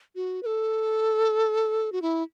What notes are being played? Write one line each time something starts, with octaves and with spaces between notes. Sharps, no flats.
F#4
B4
A4
F#4
E4